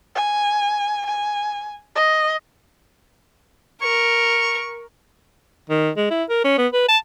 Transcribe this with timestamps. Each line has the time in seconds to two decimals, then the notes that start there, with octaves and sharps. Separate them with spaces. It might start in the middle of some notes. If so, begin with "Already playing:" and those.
0.15 G#5
1.06 G#5
1.96 D#5
3.82 A#4 C#6
5.70 D#3
5.97 G#3
6.11 E4
6.29 A#4
6.44 C#4
6.58 B3
6.73 B4
6.88 A5